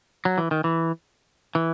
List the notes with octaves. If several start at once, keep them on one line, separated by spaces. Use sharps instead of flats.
F#3
E3
D#3
E3
E3